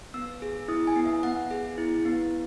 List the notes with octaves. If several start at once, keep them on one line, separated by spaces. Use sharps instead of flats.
B3 E6
G#4
E4 D#6
G#5
B3
E5
B3 F#5
G#4
E4
B3